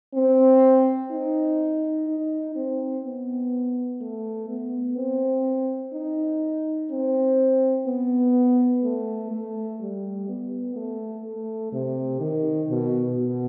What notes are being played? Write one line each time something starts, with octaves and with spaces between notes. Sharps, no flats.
C4
D#4
D#4
C4
B3
A3
B3
C4
D#4
C4
B3
A3
A3
G3
B3
A3
A3
C3
D#3
B2
B2